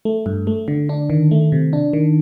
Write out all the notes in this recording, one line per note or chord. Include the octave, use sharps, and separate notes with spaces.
A3
G2
A3
D3
D4
D#3
A3
C3
D4
D#3